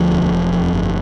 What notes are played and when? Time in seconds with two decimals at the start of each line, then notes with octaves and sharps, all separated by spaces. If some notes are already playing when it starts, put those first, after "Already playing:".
Already playing: D2 F3
0.12 E1
0.32 E1
0.52 F2
0.73 G1